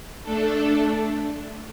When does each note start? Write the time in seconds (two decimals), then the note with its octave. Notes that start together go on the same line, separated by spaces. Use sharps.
0.23 A3 D4 A4